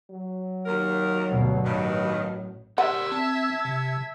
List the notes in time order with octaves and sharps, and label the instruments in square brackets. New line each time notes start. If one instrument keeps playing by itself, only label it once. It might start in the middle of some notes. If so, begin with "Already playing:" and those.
[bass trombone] F#3
[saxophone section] D#2 A#4
[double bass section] D2 G2 B2
[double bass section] A1 [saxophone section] G2 B2 D#3
[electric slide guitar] G4 A#4 D5 [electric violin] E5 G#6 [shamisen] F#5 [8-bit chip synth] C6
[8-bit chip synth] C4 [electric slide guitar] A5
[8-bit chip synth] C3